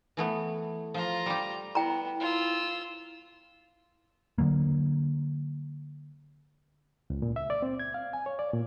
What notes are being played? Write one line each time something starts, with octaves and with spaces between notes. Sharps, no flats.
E3 A3 B3
F3 F4 A#5
G3 G4
B3 E4 G5 A#5
F4 E6
D3 E3 F#3 A#3
C#2
A#2
E5
D5
C4
G#6
F5
G#5
C#5
D5
A#2